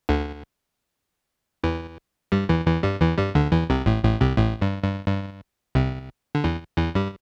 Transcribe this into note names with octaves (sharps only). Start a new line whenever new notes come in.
D2 D3
E2 E3
G2 G3
E2 E3
E2 E3
G2 G3
E2 E3
G2 G3
D2 D3
E2 E3
C2 C3
A1 A2
A1 A2
C2 C3
A1 A2
G2
G2
G2
C2 C3
D3
E2 E3
E2 E3
G2 G3